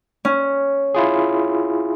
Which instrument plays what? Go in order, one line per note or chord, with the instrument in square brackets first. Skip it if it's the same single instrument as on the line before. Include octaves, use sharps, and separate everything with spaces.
[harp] C#4
[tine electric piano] E4 F4 G#4